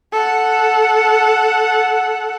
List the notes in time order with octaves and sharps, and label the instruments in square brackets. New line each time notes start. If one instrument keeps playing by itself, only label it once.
[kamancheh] A4 F#5